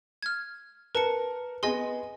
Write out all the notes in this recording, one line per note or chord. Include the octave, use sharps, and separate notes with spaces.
F6 G#6
A#4 B4 A5 C#7
B3 G#4 D#5 G#5 C6